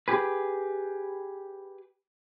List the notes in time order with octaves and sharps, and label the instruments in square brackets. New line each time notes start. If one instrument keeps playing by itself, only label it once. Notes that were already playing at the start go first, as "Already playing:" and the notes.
[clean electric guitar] G4 G#4 B4